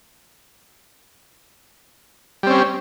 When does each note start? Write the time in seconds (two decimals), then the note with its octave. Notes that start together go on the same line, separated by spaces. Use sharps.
2.43 G3
2.47 C4
2.50 C#4